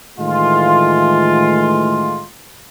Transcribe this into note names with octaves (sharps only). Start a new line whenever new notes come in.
A2 D#3 E3 G#3 A3 F4